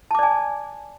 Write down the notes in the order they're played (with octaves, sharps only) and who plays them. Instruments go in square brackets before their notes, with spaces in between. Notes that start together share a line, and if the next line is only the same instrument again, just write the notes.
[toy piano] A5
D6
D5
G#5